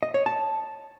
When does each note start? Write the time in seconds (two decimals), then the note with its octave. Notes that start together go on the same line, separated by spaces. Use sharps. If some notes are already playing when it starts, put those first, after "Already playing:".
0.03 D#5
0.14 C#5
0.26 A5